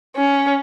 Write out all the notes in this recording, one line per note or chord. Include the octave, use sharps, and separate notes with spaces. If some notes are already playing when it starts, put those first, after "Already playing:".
C#4